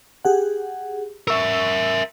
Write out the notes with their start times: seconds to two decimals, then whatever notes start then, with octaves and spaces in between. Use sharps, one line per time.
0.25 G4 G#4 F#5
1.28 A#4 E5 C#6 E6